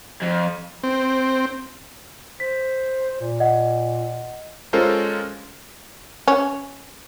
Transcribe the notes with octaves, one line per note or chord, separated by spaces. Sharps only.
F2
C4
C5 B6
A#2
D#5 F#5
G#3 C#4 F4 A4 A#4 C5
C#4